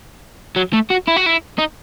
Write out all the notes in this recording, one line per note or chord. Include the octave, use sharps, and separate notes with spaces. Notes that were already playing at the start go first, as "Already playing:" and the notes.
F#3
A3
F#4
E4
F#4
E4
D#4